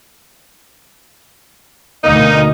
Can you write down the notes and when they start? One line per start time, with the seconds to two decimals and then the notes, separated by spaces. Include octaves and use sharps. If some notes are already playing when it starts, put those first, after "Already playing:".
2.04 D2 B2 A#3 D#4